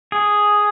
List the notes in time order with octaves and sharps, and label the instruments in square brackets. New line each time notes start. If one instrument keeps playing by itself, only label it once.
[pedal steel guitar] G#4